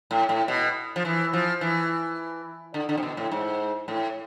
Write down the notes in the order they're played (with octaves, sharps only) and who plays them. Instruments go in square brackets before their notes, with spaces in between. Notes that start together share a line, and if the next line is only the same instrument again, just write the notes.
[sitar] A2
A2
B2
F3
E3
F3
E3
D3
D3
C3
B2
A2
G#2
A2